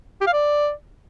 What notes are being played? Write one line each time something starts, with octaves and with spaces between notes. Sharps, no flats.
G4
F5
D5